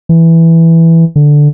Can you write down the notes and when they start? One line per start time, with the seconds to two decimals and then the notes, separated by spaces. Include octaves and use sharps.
0.09 E3
1.16 D3